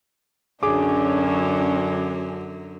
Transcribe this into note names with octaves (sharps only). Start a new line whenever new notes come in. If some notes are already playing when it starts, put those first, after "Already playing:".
F#2 D3 F#3 C#4 D4 G#4 D6